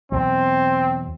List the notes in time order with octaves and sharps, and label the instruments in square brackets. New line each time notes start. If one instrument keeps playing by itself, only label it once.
[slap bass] E2 B2 F#3 [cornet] C4